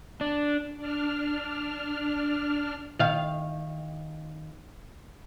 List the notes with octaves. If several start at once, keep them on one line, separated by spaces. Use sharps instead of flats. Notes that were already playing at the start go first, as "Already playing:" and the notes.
D4
D4 F6
D#3 F5